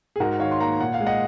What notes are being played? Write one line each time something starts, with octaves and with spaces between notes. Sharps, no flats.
G#4
G#2 F#4 A#4
D#3 C#5 F5
C6
A#3 F#5 A#5
A#2 F#5
F5
G#3
D#5 F#5